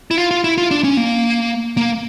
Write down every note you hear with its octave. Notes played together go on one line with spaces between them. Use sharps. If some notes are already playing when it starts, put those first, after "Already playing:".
E4
F4
F4
E4
F4
D4
C#4
A#3
A#3